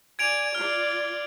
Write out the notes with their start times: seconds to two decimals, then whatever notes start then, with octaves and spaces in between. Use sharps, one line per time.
0.19 D5 G#5 G#6 D7 F7
0.55 F4 D5 F6